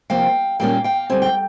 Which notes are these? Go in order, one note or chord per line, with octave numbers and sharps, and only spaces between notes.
C3 F3 A#3 F5 G5
A#2 G3 A#3 C#4 F5 G5
F5 G5
D3 G3 C4 G#5
G5